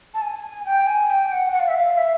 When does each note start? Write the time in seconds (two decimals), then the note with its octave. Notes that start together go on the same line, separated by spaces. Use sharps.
0.14 A5
0.22 G#5
0.65 G5
0.87 G#5
1.10 G5
1.32 F#5
1.53 F#5
1.60 F5
1.68 E5
1.75 F5
1.98 E5